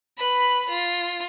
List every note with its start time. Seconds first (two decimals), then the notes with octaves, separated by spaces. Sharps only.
0.17 B4 B5
0.69 F4